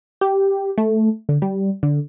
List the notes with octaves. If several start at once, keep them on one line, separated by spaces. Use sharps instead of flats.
G4
A3
D3
G3
D3